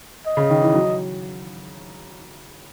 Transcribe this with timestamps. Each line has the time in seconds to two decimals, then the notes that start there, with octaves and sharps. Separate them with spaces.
0.26 D#5
0.37 C#3
0.49 D#3
0.62 E3
0.74 F#3